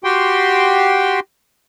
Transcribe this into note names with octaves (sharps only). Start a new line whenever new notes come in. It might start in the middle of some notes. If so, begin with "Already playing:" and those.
F#4 G4 G5 C6